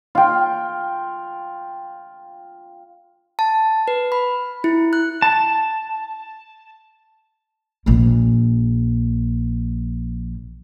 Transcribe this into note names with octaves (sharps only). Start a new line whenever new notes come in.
F4 G5
A5
B4
B5
E4
F#6
A5
A#1 A#3